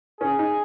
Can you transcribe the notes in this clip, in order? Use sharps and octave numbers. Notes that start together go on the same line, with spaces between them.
C#4 G#4
D#4